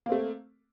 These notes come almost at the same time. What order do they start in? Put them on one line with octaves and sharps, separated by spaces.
A#3 C4 A3